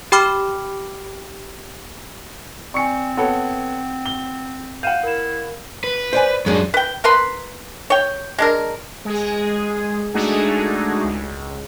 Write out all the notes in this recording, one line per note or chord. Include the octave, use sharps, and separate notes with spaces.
G4 G5 B5 D6 F6
C4 D5 G#5 C#6 C#7
B3 A4 C#5 F#5
G7
F5 F#5 G6 D#7 E7
E4 A#4 E7
B4
C5 D5 G#5
F#2 F#3 G#3 D4 G#4
B4 G5
A#4 B4 B5 C6
C#5 G5
G#3 D4 A#4
G#3 G#4
G#3 A3 D4 D#4 F#4 G#4
C#2